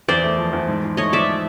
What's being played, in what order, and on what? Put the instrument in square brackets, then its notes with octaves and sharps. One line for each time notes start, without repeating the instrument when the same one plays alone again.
[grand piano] E2 [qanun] C5 D5
[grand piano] A3
F3
E2
G#2
F3
[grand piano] A3 [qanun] C#5 D#5
[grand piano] F3 [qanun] D5 E5